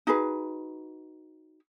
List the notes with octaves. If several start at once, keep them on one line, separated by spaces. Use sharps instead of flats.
D#4 F#4 G#4 B4